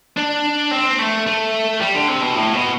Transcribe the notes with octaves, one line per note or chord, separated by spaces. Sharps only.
D4
C4
A3
A3
G3
D3
C3
B2
A2
B2